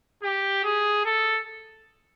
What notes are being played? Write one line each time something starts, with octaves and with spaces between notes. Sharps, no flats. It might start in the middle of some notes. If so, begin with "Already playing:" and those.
G4
G#4
A4